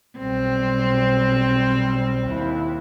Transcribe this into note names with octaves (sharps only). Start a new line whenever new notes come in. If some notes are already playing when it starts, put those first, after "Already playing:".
B1 G3 C4
D#2 E4